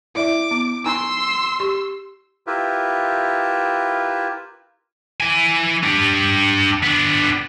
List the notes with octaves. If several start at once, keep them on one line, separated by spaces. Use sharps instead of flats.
E4 D5 E5 D6
B3
D#4 G#5 A#5 C6 E6
G4 C#6
E4 F4 G4 A#4 B4 E5
E3 G#5
D4 G4
B3 D4